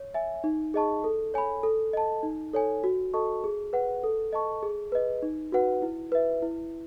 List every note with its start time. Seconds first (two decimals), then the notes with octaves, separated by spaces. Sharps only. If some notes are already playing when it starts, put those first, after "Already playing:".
Already playing: C#5
0.14 E5 G#5
0.44 D#4
0.74 G#4 D#5 A5 C#6
1.04 A4
1.34 C#5 G#5 B5
1.63 A4
1.93 D#5 A5
2.23 D#4
2.53 A4 C#5 G#5
2.84 F#4
3.14 A4 D#5 A5 C#6
3.44 G#4
3.73 B4 F#5
4.04 A4
4.33 D#5 A5 C#6
4.63 G#4
4.92 B4 D#5
5.22 D#4
5.52 F#4 B4 F#5
5.82 E4
6.12 B4 E5
6.42 E4